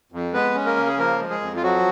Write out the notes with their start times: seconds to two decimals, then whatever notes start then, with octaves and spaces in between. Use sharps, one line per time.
0.12 F2
0.33 G#3 B3 B4
0.55 C#4
0.66 A#3 A#4
0.76 C#3
0.87 G#4
0.98 F3 A#3 A#4
1.20 G#3
1.30 G#3 G#4
1.41 F2
1.56 F4
1.62 F3 F#3 F#4